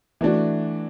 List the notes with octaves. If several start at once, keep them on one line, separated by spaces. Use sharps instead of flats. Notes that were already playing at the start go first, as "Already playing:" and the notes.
E3 A3 D4 F#4